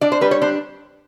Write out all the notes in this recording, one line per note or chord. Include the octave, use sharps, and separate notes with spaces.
D4 D5
C5
G3 B4
C#5
D4 C5